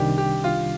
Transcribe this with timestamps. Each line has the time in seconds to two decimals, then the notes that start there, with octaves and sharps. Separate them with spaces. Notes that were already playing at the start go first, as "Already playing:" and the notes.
Already playing: C2 C3 D#3 G3 D4 G4
0.18 G4
0.44 F4